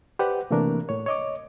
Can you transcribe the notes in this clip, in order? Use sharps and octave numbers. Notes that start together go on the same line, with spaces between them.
G4 B4 C5 D5 F#5
C3 E3 A3 A#3 D4 A#4
A2 C#5
C#5 D#5 D6